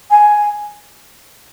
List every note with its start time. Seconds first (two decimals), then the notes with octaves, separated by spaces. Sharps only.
0.10 G#5